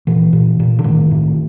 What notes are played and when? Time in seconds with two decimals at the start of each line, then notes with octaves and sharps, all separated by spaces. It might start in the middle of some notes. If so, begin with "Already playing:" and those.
0.07 A#2 E3
0.33 A#2
0.60 A#2
0.79 D3
0.84 A2 D#3
1.11 A2